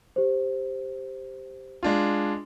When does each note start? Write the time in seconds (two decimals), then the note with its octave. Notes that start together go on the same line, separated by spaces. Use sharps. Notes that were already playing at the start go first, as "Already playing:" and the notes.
0.16 G4 C5
1.83 G#3 D4 F4